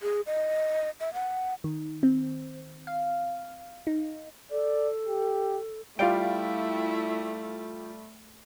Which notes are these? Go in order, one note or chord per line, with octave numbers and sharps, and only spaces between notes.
G#4
D#5
E5
F#5
D#3
C4
F5
D#4
A4 D5
G4
G3 A3 E4 F4 D5 F5 G5